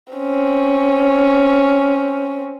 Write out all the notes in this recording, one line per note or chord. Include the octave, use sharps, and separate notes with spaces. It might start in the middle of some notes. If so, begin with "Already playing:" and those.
C4 C#4